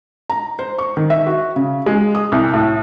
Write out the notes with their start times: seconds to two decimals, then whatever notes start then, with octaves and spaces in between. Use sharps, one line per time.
0.30 A#5
0.59 C5
0.78 C#6
0.97 D#3
1.10 E5
1.27 F#4
1.56 C#3
1.86 G#3
2.15 D#6
2.32 C2
2.54 A2